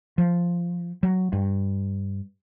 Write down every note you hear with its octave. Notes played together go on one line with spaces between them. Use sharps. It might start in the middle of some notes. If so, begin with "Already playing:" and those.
F3
F#3
G2